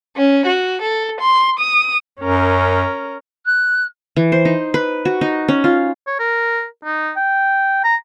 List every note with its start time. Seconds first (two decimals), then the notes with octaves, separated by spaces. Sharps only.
0.17 C#4
0.46 F#4
0.82 A4
1.21 C6
1.60 D#6
2.20 F#2 C#4 A#4
3.45 F#6
4.16 E3
4.32 C5
4.45 D#4
4.74 B4
5.05 F#4
5.21 D#4
5.48 C#4
5.64 F4
6.07 C#5
6.19 A#4
6.84 D#4
7.16 G5
7.84 A#5